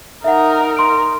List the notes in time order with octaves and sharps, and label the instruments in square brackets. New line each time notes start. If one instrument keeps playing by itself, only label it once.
[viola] D#4 A#4 [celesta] E5 F#5
[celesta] C6 D7